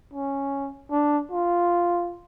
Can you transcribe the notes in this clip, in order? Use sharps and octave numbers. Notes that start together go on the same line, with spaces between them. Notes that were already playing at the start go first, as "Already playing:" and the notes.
C#4
D4
F4